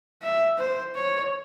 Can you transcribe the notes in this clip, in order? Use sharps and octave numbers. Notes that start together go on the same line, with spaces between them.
E5
C5
C#5